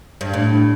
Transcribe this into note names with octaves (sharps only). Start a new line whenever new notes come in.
G2
A2